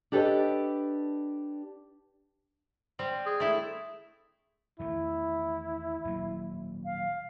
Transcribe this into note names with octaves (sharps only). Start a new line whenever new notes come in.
D4 G4 A4 B4 C#5 D#5
G3 C4
G#4
A3 E4
E2 D#3 A3 E4
D#1 F#3 A#3
F5